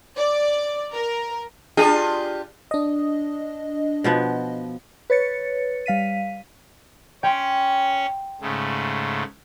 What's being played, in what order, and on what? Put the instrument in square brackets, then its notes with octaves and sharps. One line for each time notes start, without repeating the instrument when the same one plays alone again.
[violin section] D5
A#4
[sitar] D4 F4 G4 [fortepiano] G#4
[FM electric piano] D4 D#5
[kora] B2 F3 B3
[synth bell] B4 C#5 A6 C#7
G3 F5 B6 D#7
[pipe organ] C#4 C#5 [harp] G5 C6 B6
[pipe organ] G#2 C#3 A3